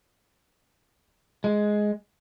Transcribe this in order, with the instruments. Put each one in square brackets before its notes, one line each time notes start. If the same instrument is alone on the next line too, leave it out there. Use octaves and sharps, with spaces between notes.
[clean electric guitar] G#3